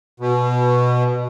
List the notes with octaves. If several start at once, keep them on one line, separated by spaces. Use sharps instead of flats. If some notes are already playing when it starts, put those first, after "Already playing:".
B2